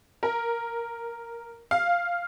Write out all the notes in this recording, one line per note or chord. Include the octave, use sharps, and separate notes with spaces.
A#4
F5